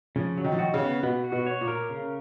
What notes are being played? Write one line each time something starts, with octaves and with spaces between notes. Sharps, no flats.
C#3 F3
F#3
D#3
F3
D#3 F#4
C#3
B3
B2 B3
F#4
B2
C#5
A#2
A#4
C#3